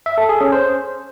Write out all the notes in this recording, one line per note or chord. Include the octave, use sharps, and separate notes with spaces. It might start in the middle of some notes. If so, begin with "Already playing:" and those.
E5
A4
G#4
C#4
C5